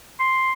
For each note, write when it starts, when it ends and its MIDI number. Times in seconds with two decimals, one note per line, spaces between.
0.20 0.53 84